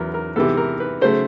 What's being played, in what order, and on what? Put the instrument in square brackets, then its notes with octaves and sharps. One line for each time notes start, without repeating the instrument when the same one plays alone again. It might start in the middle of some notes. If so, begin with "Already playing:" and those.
Already playing: [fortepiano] E2 C#3 F#3 A#4 B4
A#4
C3 E3 G#3 B3 A4
A#4
B4
C#3 F#3 A3 C5